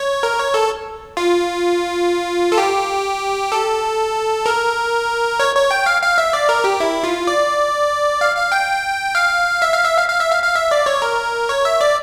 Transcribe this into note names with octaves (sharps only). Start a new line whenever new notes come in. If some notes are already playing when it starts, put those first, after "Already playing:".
Already playing: C#5
A#4
C#5
A4
F4
A4
G4
A4
A#4
C#5
C#5
G5
F5
F5
E5
D5
A#4
G4
E4
F4
D5
F5
F5
G5
F5
E5
F5
E5
F5
F5
E5
F5
F5
E5
D5
C#5
A#4
C#5
E5
D5